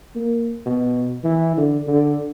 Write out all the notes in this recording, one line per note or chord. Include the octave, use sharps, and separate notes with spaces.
A#3
B2
E3
D3
D3